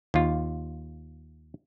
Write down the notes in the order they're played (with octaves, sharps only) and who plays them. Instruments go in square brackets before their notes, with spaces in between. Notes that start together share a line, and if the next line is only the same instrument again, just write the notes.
[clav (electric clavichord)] D#2 F4